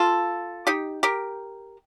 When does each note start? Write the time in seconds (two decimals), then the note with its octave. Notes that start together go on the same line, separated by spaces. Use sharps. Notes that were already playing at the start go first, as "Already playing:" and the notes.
Already playing: F4 A4
0.67 D#4 G4
1.03 G4 A#4